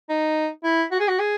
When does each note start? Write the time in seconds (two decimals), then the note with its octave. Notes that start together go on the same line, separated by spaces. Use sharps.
0.10 D#4
0.64 E4
0.92 F#4
1.00 G#4
1.08 F#4
1.19 G#4